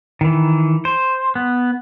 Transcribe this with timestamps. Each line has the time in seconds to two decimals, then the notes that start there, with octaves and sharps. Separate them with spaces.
0.21 D#3 E3
0.85 C5
1.35 B3